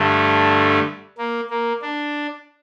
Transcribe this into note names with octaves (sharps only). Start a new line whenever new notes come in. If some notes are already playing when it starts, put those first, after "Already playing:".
Already playing: G2 D3 A3
A#3
A#3
D4